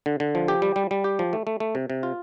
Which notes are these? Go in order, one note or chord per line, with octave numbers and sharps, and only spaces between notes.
D3
D3
F3
G4
G3
G3
G3
G4
F3
A3
A3
A3
C3
C3
F4